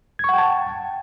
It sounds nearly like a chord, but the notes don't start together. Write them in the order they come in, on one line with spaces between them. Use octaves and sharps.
G#6 C#6 F#5 G5 A5